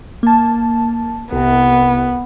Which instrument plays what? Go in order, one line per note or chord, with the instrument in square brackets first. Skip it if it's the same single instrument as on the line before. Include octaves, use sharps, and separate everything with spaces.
[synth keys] A#3 A5
[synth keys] C2 C3 [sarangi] B3